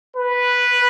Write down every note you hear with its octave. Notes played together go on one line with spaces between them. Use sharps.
B4